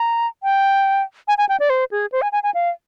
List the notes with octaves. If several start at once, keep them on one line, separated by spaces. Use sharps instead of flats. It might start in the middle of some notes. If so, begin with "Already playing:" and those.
Already playing: A#5
G5
G#5
G#5
G5
D5
C5
G#4
C5
G#5
G#5
G#5
F5